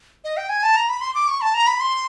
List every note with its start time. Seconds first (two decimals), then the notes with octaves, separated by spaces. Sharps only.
0.24 D#5
0.37 G5
0.49 G#5
0.63 A5
0.76 A#5
0.89 B5
1.01 C6
1.15 D6
1.28 C#6
1.41 A5
1.54 A#5
1.67 B5
1.80 C6